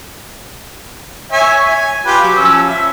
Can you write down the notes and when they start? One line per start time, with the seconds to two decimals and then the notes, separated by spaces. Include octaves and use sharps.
1.32 C#5 E5 G#5
1.65 G#5
2.06 F4 G4 B4
2.23 F#3
2.36 F3 C#4 E6
2.70 E5